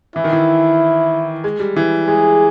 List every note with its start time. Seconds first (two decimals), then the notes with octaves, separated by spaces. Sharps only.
0.16 E3 E4
0.24 D#3
0.33 E3
1.44 G#3
1.60 G3
1.76 E3
2.08 G#3 G#4